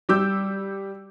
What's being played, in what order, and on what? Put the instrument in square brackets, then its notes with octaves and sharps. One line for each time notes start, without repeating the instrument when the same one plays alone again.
[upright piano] G3 D6 E6 G6